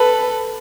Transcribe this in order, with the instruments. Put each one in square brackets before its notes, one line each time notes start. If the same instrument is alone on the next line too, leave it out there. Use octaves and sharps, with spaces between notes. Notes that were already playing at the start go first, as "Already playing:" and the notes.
Already playing: [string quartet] A4 B4